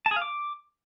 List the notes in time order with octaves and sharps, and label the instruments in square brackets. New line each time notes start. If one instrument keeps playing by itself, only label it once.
[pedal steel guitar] A5
G#4
F5
D6